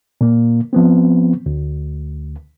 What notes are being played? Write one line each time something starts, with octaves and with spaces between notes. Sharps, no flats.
A#2 A#3
F3 B3 C4
D2